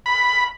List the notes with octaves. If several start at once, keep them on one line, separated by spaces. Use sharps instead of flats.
B5